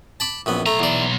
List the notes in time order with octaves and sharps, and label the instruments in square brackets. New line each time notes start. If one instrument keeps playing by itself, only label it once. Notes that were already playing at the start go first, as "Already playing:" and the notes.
[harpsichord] A5 B5 D6
A#1 F#2 B3
[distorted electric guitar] B1 A#5 [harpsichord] A3
[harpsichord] E2 D5